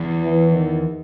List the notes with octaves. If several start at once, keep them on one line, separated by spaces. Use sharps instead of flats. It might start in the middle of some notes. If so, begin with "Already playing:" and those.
Already playing: E2
E3
D#3